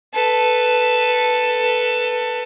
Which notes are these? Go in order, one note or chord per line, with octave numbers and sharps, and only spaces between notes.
A4 B4